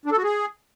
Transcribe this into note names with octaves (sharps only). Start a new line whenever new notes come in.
D4
A4
F#4
G#4